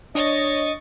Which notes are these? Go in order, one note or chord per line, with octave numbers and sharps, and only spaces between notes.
D4 C#5 D#5 C#6 A6